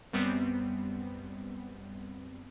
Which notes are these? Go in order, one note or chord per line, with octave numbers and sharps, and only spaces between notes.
F#2 G3 B3 C4